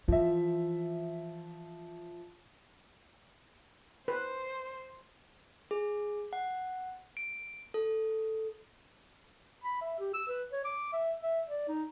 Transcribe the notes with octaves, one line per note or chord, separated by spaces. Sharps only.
E3 F3 E5
B4 C5
G#4
F#5
D7
A4
B5
E5
G4
E6
B4
C#5
D6
E5
E5
D5
D#4